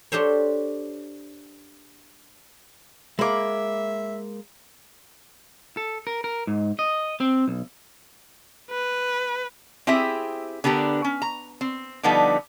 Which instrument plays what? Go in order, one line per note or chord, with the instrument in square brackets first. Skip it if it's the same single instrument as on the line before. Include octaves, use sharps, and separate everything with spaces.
[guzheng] D4 G4 A4 C5 C#5
[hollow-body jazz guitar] G#3 A#3 [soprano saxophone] E5 [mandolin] B5 D6
[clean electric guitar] A4
A#4
A#4
G#2
D#5
C4
B1
[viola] B4
[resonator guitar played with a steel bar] C4 E4 G4 G#4 E5
D3 B3 D4 G4 A#4
C#4
A#5
C4
D3 F3 G3 B3 D#4 A4